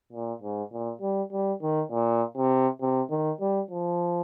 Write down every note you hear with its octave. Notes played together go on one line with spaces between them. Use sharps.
A#2
G#2
A#2
G3
G3
D#3
A#2
C3
C3
D#3
G3
F3